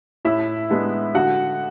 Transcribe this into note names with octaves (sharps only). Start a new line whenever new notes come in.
A2 E4 E5
G#3 B3 D4
D3 F#4 F#5